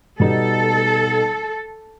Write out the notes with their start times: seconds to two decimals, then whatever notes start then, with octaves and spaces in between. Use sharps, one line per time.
0.19 B2 G3 B3 D#4 A4